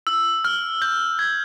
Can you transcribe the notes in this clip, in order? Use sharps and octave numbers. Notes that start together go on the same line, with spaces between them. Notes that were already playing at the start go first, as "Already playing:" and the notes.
E6
F6
G6
G#6